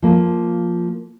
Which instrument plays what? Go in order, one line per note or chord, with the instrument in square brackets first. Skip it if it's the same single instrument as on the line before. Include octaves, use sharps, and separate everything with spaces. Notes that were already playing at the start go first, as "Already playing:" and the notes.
[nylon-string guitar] F3 A#3